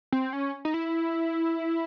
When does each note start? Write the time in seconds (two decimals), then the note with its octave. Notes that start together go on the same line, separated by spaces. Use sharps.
0.12 C4
0.33 C#4
0.65 D#4
0.74 E4